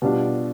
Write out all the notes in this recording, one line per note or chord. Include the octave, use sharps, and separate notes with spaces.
B2 G3 D4 F4